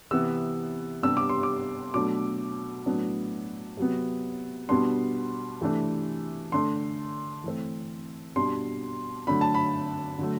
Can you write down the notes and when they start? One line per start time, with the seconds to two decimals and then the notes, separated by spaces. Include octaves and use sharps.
0.11 C3 E3 B3 E6
1.02 C3 G3 B3 D4 E6
1.17 D6
1.29 C6
1.43 D6
1.94 B2 F#3 A3 D4 D6
2.86 A2 F#3 B3 D4
3.77 C3 F#3 B3
4.69 B2 G3 B3 D4 C6
5.61 C3 E3 A3 D4
6.52 D3 A3 D4 C6
7.44 E3 A3 C4
8.36 B2 G3 D4 C6
9.27 D3 F#3 A3 D4 B5
9.41 A5
9.54 B5
10.19 D3 F#3 A3